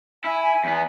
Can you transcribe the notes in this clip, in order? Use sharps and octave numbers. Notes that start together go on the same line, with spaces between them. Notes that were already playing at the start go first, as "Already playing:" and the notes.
E4 G#5
E2 B3